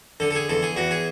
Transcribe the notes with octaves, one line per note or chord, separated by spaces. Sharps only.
D3 A4
A4
G#4
E2 A4
G#4
E2 F#4
G#4